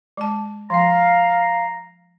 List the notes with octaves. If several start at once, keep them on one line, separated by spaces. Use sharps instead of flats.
G#3 A5
F3 F5 G5 A#5